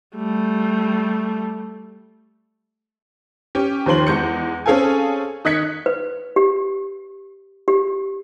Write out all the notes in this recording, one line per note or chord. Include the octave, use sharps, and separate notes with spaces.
G3 A3
C#4 G4
D#2 D#3 F3 C6 F#7
E2 G#3 G6 C#7
C4 C#4 G#4 A4 F5 G#5
D#3 D#5 F#6 G#6 B6 C#7
B4
G4
G4